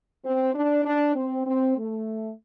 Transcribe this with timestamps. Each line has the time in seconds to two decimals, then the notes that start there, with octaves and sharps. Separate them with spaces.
0.24 C4
0.54 D4
0.85 D4
1.14 C4
1.45 C4
1.76 A3